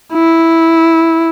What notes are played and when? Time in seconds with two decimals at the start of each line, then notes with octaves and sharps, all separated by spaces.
0.13 E4